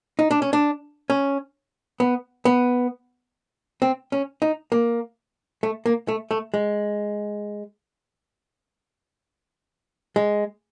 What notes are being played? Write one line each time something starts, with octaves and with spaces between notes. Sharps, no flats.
D#4
D4
C#4
D4
C#4
B3
B3
C4
C#4
D#4
A#3
A3
A#3
A3
A3
G#3
G#3